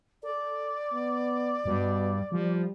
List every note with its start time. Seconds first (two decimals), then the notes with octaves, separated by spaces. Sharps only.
0.23 A4 D5
0.92 B3
1.66 G2 B2
2.32 F3 G3